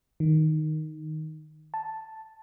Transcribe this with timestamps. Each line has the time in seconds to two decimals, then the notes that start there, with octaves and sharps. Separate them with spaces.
0.20 D#3
1.74 A5